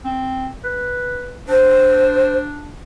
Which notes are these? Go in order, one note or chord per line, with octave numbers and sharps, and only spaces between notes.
C4
B4
D4 C5